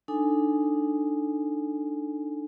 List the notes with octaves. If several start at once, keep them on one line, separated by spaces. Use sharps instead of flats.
D4 D#4 A4 G#5